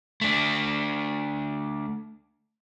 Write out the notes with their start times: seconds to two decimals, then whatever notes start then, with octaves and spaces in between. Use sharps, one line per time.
0.21 A3 D4